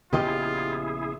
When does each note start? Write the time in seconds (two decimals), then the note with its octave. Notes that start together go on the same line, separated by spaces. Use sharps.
0.13 A#1 C#3 B3 E4 F4 G4 G#4 D#5